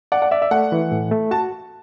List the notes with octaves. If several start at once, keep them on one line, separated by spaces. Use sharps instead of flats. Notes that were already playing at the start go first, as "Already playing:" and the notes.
D5 F#5
F#5
D5 E5
E5
A3 F#5
E3
A2
A3
F#4 A5